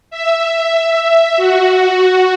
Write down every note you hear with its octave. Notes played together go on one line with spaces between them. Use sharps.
E5
F#4